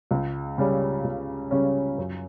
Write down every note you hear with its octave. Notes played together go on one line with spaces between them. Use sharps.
C#2
C#3 G3 C#4
C#2
C#3 G3 C#4
F#2